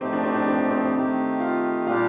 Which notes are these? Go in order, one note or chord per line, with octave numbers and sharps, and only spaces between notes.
A2 F3 A3 C4 D#4 G4
D4
C4
D4
C4
C4
D#3 A3 D#4 G4
F4
A#2 G3 D4 F4 G4